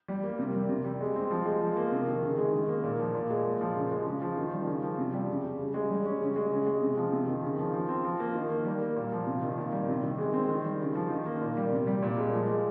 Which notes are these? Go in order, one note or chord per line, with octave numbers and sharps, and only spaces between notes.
G3
A#3
C3
G3
C3
G3
G#3
C4
F3
G#3
F3
A#3
C3
D#3
C#3
G#3
D#3
A#3
A#2
F3
A#2
G#3
A#2
F3
C#3
G#3
C#3
F3
D#3
G3
C#3
F3
C3
G3
C#3
G3
C#3
G#3
G3
C#4
C#3
G#3
C#3
G#3
C3
F3
C3
D#3
C#3
F3
F3
C4
F3
A#3
D#3
A#3
G3
A#3
A#2
F3
C3
D#3
A#2
G3
C3
D#3
G#3
C4
D#3
G3
C#3
F3
D#3
A#3
A#2
G3
C3
G3
A#2
G#3
F3
G#3